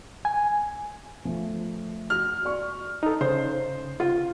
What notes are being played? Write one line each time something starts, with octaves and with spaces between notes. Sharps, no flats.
G#5
F3 A3
F#4 F6
D5 C#6
D#4 A4
C#3 C5
F4